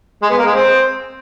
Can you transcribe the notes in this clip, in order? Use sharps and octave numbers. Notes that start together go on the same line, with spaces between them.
G#3
B3
A#3
G#3
C4